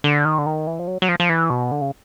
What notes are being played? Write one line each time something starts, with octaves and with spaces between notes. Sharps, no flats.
D3
D#3
D3
D#3
E3
F3
F#3
F#3
F3
F3
E3
B2
D3
C#3